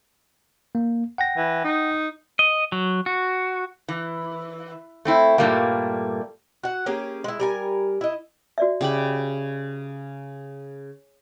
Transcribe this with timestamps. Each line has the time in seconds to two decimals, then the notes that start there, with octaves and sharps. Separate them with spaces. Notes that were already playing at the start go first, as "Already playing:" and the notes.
0.75 A#3
1.18 F#5 G5 A#6
1.36 E3
1.65 D#4
2.39 D#5
2.72 F#3
3.06 F#4
3.88 E3
5.05 A3 C4 E4
5.38 G2 A#2 G3 A3 A#3
6.63 F#4 F#5
6.86 A#3 C#4 G4 G#4
7.24 G#3 E4
7.40 G3 A#4 G#5
8.01 E4 D#5
8.58 F#4 D5 E5
8.81 C#3 G4 B5